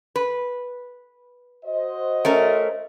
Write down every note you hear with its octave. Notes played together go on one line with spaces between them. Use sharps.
B4
F#4 C5 D#5
A3 C#4 A#4